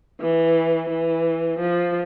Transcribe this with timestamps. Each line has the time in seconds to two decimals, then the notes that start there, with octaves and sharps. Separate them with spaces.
0.20 E3
0.89 E3
1.59 F3